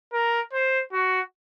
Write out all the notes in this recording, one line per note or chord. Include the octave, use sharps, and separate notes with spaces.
A#4
C5
F#4